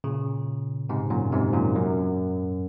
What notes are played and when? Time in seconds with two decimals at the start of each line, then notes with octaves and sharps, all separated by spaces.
0.04 A#2 C#3
0.89 G#2 C3
1.10 F#2 A#2
1.33 G#2 C3
1.53 F#2 A#2
1.75 F#2